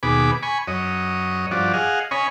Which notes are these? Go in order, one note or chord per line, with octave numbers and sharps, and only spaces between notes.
D#2 B2 G#4 B5 D6
G#5 B5 C#6
F#2 C#5 D#5
G2 F3 F#4 D5
G#4 D#5 F5 F#5
C#4 C#5 D#5 G#5 B5